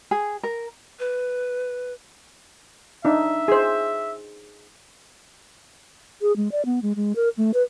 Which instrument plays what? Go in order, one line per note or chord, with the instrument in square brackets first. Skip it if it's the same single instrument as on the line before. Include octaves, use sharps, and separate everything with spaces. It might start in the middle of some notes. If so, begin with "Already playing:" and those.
[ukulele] G#4
A#4
[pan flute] B4
[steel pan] D4 D#4 [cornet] E5
[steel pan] G#4 C5
[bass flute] G#4
G#3
D5
B3
G#3
G#3
A#4
A3
B4